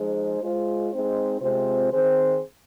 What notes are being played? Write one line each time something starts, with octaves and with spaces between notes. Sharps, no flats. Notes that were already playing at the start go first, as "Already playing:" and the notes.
Already playing: F3 G#3 D#4 G#4 C5
G#3 F4 C5
G#3 C4 D#4 C5
C3 G#3 C4 F4 C5
D#3 C4 G#4 C5